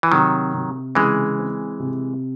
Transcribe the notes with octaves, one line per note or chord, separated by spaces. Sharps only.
E3
C3 D#3 F#3
C3
C#3 E3 G#3
C4
C3